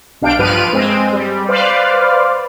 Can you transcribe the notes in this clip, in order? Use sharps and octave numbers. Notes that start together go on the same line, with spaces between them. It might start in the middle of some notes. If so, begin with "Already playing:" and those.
B1 D4 F5 G5 D7
G2 F3 B4 F6 D7 D#7
G#3 C4
G3
B4 C5 D5 F5